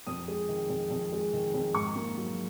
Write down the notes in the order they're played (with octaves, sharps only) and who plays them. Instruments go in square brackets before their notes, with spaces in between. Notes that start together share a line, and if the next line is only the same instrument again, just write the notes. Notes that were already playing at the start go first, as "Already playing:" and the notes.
[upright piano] F2 D#6
G#3
D#3
F2
F2
G#3
D#3
F2
G#2 C#6
A#3
F#3